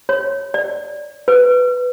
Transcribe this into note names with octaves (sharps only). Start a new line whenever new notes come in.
C#5
D5
B4